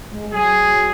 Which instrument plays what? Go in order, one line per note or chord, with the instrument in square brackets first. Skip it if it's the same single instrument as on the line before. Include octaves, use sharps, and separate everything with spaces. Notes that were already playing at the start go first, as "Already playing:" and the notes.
[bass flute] G#3
[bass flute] F#3 [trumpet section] G#4